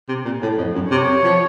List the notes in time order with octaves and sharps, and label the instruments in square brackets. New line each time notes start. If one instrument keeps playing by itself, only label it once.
[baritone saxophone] C3
A#2
A2
F2
F#2
[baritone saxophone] C3 [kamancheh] C#5
[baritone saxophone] F3